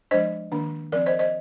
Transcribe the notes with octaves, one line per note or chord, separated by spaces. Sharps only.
F3 G#3 D4 C5 D#5
D#3 A#3 D4
F3 C4 A#4 D5
C5 D#5
C5 D#5